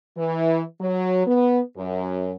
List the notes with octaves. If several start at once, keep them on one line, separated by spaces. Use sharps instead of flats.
E3
F#3
B3
F#2